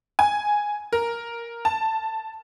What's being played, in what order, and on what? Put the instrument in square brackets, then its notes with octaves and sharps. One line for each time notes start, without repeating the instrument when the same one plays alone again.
[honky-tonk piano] G#5
A#4
A5